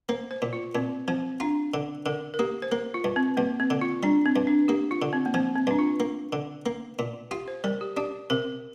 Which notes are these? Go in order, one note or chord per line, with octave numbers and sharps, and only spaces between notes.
A#3 C5
C5
A#2
F4
A#2 C4
F3 C4
D4 F4
D3
D3 A#4
A#4
A#3 G4
C5
A#3 A#4
F4
G2
C4
G2 A#3
C4
D3
F4
G3 D4
C4
G2
D4
A#3 G4
F4
D3
C4
A#3
F3 C4
C4
G2 D4
F4
A#3
D3
A#3
A#2
F4 G4
C5
G3 A#4
G4
D4 G4
C3 A#4